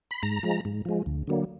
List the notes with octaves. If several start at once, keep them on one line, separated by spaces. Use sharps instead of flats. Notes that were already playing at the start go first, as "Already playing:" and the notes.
B5
G#2 A#5
F3 G#3
G#2
F3 G#3
D2
D3 F#3 A#3